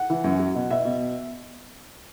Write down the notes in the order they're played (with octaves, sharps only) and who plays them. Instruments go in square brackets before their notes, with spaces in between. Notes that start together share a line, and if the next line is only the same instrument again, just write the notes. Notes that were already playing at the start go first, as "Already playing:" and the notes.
Already playing: [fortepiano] F#5
E3
F#2
F#3
B2
B2 E5
B2